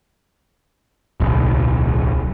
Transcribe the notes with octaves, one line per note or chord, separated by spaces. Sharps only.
D1 B1